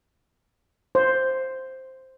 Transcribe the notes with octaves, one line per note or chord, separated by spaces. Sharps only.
C5